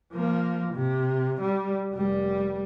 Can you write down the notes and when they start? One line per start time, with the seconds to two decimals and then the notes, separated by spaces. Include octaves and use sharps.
0.13 F3 A#3
0.74 C3
1.41 G3
1.92 F1 G3